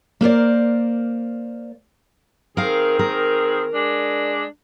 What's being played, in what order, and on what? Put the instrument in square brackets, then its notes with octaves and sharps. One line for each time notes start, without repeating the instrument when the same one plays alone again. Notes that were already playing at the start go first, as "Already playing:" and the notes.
[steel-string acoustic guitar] A#3 A#4 C5 D5
[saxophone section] D#3 C4 G#4 [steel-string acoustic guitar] A#4 F5
[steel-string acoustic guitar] A#4
[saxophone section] G#3 D4